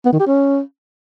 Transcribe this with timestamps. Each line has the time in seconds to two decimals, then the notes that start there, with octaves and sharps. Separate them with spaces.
0.05 B3
0.12 D#3
0.20 G4
0.27 C#4